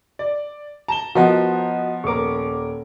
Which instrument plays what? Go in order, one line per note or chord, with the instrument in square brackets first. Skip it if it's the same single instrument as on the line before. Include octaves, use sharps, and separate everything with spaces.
[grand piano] D5
[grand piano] A5 [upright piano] A#5 E7 G7
[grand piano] F3 B3 [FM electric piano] F#4 D#5 F#5 [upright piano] A#4 C5 A#5
[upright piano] D#1 A#4 [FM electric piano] C#6 D6